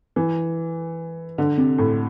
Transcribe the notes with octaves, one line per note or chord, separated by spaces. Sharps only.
E3
D3
C3
A2